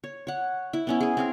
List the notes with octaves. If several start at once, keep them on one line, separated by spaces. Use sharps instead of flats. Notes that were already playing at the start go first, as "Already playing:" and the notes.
C#5
C#5 F#5
E4
B3 C#4 E4
G#4 G#5
C4 G#4 A#4